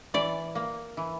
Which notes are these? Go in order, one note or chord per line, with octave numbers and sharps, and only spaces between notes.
E3 D5
A#3
E3